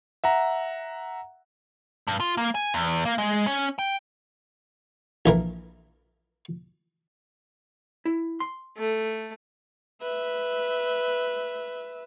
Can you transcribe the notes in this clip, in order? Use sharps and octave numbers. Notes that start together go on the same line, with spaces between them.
E5 F#5 A#5
G2
F4
A#3
G#5
E2
A#3
G#3
C#4
G5
A#1 E3 A#4
E4
C6
A3
B4 E5